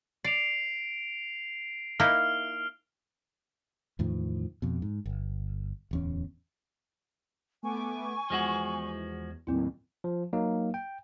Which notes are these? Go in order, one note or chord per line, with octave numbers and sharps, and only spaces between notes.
D5 C7 D7 F7
A#3 D#4 E4 F6
E2 A2 D#3 F3
F2 B2
G#2
G1
D1 E2 C#4
A3 B3 G#5 C#6 D6
E2 F3 G#3 F#4
D#2 A2 F#3 C4 E4
F3
F#3 A#3 D#4
G5